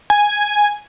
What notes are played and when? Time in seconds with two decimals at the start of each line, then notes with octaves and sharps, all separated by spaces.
0.10 G#5